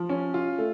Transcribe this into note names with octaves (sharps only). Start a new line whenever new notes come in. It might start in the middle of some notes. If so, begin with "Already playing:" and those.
Already playing: F3
C#4
F4
A3